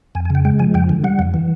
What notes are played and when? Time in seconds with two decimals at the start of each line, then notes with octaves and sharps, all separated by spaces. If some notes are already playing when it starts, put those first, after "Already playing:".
0.15 F2 G#5
0.25 G#5
0.30 C#3 G5
0.45 G#3 G5
0.59 F3 G#5
0.74 F2 G5
0.89 D3
1.04 G3 F#5
1.19 F2
1.34 E3